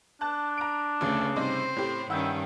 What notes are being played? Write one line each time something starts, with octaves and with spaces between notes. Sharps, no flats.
D4 A5 F#6
A#5 D7
F1 D2 C#3 A3
G2 C3 C4 D#4 C5
A2 G4
G2 D#3 C#4 E4 F#5 E6 G6